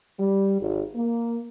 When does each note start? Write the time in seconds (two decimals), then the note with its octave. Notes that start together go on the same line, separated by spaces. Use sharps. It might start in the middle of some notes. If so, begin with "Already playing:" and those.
0.19 G3
0.60 G#1
0.95 A#3